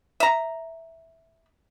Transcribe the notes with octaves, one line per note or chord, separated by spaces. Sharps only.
E5 A#5